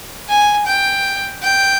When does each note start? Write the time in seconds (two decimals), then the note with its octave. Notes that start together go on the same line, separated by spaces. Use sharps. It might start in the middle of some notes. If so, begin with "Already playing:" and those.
0.28 G#5
0.66 G5
1.42 G5